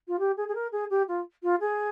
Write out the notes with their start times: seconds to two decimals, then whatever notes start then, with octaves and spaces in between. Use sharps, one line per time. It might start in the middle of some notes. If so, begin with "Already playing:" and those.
0.08 F4
0.19 G4
0.37 G#4
0.48 G#4
0.55 A#4
0.72 G#4
0.90 G4
1.08 F4
1.43 F4
1.61 G#4